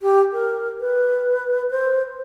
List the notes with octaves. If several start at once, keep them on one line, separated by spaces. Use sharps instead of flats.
G4
A#4
B4
C5